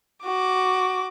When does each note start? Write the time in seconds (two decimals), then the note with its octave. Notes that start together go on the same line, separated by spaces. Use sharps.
0.24 F#4 D6